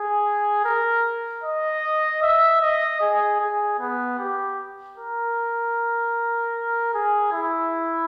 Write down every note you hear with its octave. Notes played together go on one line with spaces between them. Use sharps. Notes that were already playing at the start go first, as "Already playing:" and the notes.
Already playing: G#4
A#4
D#5
E5
D#5
G#4
G#4
B3
G4
A#4
G#4
E4